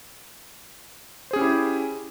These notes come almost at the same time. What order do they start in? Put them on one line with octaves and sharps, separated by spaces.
C5 G#4 C#4 G4 E4